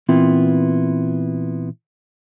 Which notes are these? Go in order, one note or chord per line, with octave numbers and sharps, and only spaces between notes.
A#2 E3 B3 C4 E4 F4